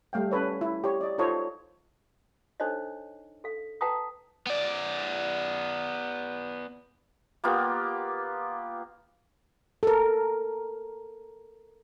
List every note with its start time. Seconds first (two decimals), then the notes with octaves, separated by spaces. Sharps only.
0.13 G3 A3 F5 G5
0.31 C#4 A4 B4 C#5
0.61 E4
0.84 G4 C#5
1.01 D5 D#5
1.18 D#4 F4 A4 C5 C#5 D#5
2.60 D4 D#4 A4 C5 C#5 D#5
3.44 A4 F5
3.81 B4 F5 G5 A5 A#5 D#6
4.47 B3 D5
7.44 A#3 B3 F4 G4
9.83 A4 A#4